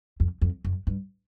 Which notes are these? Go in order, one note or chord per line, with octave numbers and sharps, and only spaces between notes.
F2
F2
F#2
G2